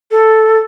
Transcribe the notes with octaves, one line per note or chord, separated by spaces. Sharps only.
A4